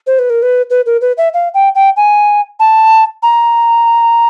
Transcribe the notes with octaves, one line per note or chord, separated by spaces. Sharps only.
C5
B4
A#4
B4
B4
A#4
B4
E5
F5
G5
G5
G#5
A5
A#5